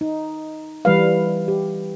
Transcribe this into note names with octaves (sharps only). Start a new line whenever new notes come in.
D#4
E3 G3 B4 F5
G4